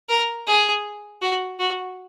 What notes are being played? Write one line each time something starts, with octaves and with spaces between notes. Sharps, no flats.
A#4
G#4
F#4
F#4